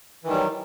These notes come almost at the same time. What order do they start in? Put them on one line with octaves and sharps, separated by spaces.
E3 D#3 G3 F#3